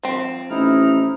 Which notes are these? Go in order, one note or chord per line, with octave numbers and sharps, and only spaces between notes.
F3 C4
A1 D#4 E4 F6